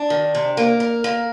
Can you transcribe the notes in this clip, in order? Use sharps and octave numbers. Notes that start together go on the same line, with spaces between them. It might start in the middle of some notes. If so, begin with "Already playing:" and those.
Already playing: D4
D#3
C3
A#3
A#4
A#3